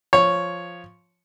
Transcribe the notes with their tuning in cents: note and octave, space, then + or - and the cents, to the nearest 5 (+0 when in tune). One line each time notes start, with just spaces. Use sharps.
F3 +0 C#5 +0